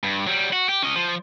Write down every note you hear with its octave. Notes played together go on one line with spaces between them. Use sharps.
G2
F#3 G3
F#4
G4
C#4 D#5
F3